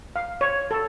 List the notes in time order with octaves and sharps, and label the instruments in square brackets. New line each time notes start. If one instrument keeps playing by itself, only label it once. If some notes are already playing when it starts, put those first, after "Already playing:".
[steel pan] F5
C#5
A4